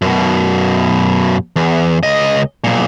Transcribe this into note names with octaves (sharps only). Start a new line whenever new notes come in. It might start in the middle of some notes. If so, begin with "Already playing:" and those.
F#2 B2
E2
C#2 D#5
B1 A#2